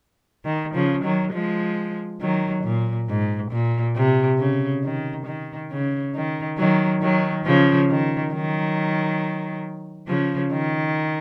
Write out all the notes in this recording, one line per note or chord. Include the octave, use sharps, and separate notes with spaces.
D#3
C#3 F3
D#3 F#3
F3 G#3
D#3 F#3
A#2
G#2
A#2
C3
C#3
D#3
D#3
C#3
D#3
D#3 F#3
D#3 F#3
C#3 F3
D#3
D#3 F#3
C#3 F3
D#3